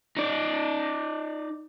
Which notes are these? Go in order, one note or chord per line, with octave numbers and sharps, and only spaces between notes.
D#4 D5